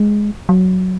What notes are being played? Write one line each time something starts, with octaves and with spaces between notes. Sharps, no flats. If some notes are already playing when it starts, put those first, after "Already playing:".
Already playing: G#3
F#3